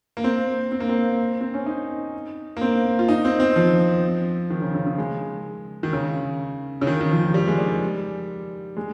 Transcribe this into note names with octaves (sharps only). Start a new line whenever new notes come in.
A#3
C4
C4
A#3
C4
C4
C#4
D#4
A#3
C4
F4
D#4
C4
C4
F3
D#3
C#3
C#3
C#3
G#3
D#3
C#3
C#3
D#3
D#3
F3
G3
G#3
G3
G#3